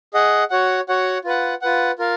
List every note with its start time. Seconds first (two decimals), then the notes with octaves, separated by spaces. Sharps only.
0.14 G#4 D#5 F#5
0.50 F#4 C#5 F#5
0.89 F#4 C#5 F#5
1.24 F4 B4 F#5
1.62 F4 B4 F#5
1.99 F4 A#4 F5